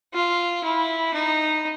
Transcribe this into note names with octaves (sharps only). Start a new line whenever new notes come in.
F4
E4
D#4